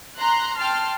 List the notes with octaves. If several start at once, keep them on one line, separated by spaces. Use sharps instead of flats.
A#5 C6 F#6
G5 A5 C6 F6